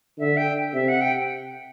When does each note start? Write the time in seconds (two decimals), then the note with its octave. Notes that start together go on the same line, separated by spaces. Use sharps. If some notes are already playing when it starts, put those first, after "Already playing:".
0.18 D3 E5
0.37 G5
0.73 C3 E5
0.88 F#5
1.01 G5